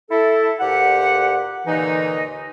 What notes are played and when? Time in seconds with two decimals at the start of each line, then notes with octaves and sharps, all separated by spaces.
0.10 E4 A4
0.60 D2 A#2 G4 F#5
1.67 D#2 A#2 D3 E3 D#4